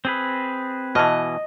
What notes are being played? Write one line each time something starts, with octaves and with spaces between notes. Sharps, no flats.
C4 G#4 B4
B2 E3 D#5 A5 F6